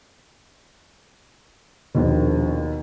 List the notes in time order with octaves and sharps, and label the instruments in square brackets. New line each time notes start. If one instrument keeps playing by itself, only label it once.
[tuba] A#1 [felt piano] D#2 B2